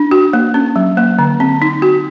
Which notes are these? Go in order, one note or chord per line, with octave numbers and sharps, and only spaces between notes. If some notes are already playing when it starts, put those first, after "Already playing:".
Already playing: D4
F#4
A#3
C#4
F#3
A#3
D3
C4
D#4
F#4